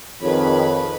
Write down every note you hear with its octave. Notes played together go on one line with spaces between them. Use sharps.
F2 D#3 G#4 B4 C#5 B5